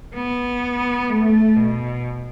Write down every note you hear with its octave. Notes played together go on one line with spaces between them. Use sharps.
B3
A3
B2